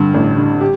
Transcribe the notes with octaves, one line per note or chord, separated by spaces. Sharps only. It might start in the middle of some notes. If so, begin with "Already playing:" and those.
Already playing: G2 D3
A1
D3
G4